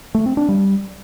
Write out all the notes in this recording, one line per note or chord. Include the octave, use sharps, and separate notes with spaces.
A3
C4
D4
G3